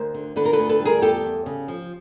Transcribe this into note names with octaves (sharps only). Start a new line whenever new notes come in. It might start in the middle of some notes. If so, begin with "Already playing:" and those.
Already playing: D2 A#4 C5
D3
D3 A4 B4
A#4
A4 B4
D2
A4 B4
G3
G#4 A#4
E2 G4 A4
E2
C#3
F3